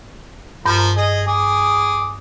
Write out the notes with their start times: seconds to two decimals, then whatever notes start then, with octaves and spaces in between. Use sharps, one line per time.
0.66 G2 F3 A#4 G6
0.97 G#4 D#5
1.28 G#4 D6 D#6